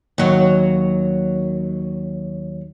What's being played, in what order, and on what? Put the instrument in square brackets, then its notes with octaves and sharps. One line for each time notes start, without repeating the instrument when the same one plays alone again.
[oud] D#2 F#3